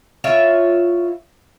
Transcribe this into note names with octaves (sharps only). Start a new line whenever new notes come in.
E4 F4 C#5 E5